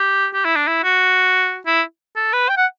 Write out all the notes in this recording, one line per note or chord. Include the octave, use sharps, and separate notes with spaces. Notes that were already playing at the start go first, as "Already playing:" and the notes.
Already playing: G4
G4
E4
D4
E4
F#4
E4
A4
B4
G5
F#5